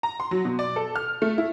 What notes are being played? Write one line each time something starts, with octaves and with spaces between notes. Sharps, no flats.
A#5
C6
F#3
B2
D5
A4
F6
A3
E4